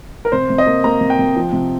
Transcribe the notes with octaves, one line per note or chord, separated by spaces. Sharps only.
A#4
C3 C5
C3
D#5
A#3
A#3 A#5
C3
G5
C3
F3
C3